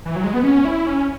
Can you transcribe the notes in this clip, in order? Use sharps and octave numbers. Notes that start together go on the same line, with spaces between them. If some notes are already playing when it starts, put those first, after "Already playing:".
E3
F#3
G#3
B3
C#4
E4
C#4